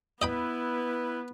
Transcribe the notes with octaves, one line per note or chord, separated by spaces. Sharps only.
B3 E4 B4 D#5 G5 B5